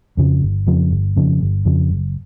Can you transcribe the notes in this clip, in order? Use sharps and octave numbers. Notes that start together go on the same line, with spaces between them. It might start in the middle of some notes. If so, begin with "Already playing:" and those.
F2 C#3 F3
G1
F2 C#3 F3
G1
F2 C#3 F3
G1
F2 C#3 F3
F#1